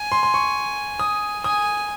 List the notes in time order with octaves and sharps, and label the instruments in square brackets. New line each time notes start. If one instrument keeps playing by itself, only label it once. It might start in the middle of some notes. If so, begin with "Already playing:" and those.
Already playing: [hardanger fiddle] G#5
[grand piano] C6
C6
C#6
D#6
[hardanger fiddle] G#5 [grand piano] D#6